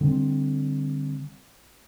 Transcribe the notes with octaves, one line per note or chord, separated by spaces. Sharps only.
D3 G3 B3 C4